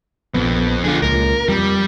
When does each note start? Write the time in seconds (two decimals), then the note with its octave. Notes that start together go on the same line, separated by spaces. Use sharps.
0.34 A#1 F2 B3
0.84 D3 F4 G#4
1.02 C#2 A#2 A#4
1.49 F2 G3